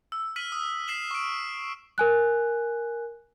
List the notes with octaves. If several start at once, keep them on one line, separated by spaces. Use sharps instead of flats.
E6
F6 B6 D#7 F#7
D#6
B6 C7 E7 F#7
C#6 D7
A#4 G#5 F#6